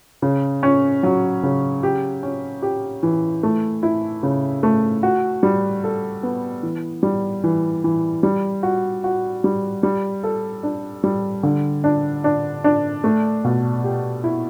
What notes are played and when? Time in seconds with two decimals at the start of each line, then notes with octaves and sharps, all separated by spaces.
0.22 C#3
0.63 C#4
1.03 F#3
1.43 C#3
1.83 G4
2.23 C#4
2.62 G4
3.03 E3
3.43 A3
3.83 E4
4.23 C#3
4.63 A3
5.03 F#4
5.43 G3
5.84 A4
6.23 B3
6.63 E3
7.03 G3
7.44 E3
7.84 E3
8.23 G3
8.63 F#4
9.04 F#4
9.44 G3
9.83 G3
10.23 A4
10.63 D4
11.04 G3
11.43 D3
11.84 D4
12.24 D4
12.64 D4
13.04 A3
13.44 B2
13.84 G4
14.24 E4